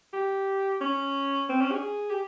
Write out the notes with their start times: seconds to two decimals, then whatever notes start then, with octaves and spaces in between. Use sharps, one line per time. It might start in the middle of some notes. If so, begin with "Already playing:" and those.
0.13 G4
0.81 C#4
1.49 C4
1.61 C#4
1.72 G#4
2.10 G4